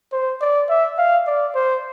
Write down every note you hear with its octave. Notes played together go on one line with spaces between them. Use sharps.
C5
D5
E5
F5
D5
C5